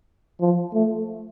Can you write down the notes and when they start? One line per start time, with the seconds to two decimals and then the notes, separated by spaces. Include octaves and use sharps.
0.40 F3
0.74 A3